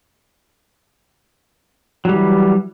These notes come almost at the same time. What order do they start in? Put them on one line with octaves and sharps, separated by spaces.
F#3 G3 E3